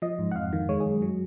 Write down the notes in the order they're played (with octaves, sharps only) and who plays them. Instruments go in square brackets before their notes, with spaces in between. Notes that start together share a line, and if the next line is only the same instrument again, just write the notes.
[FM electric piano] F3 D#5
G#2
F#5
F2 F5
D#3
G#3 C#5
G#4
F#2
F#3